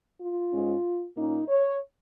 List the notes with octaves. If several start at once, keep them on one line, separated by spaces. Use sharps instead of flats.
F4
G#2 G#3 C#4
A#2 A#3 C#4 D#4
C#5